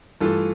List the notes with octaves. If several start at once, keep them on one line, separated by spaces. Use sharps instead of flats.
G2 E3 A3 F4 A4